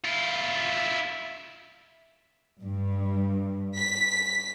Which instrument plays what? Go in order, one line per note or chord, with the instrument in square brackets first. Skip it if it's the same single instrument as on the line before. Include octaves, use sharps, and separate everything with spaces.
[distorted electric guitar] E4 F4
[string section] G2
B6